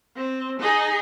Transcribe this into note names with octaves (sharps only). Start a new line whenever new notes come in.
C4
D#4 G#4